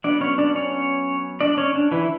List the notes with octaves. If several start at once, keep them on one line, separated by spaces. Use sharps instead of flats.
F#3 B3 D4 D5
C#4 C#5
D4 D5
C#4 C#5
D4 D5
C#4 C#5
D4
E3 E4